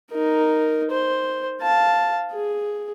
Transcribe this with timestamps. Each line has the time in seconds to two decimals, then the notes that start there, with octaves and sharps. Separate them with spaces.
0.12 D#4 A#4
0.91 C5
1.61 F5 A5
2.33 G#4